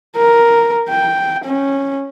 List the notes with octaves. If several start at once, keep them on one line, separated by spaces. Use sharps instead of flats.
A#4
G5
C#4